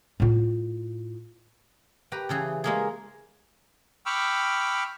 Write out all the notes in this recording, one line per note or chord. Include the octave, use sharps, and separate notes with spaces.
A2 F4
G4 B4 A#5
C#3 E3 G#4
G#3 A#3 G#4
G5 B5 C#6 D6 E6 F6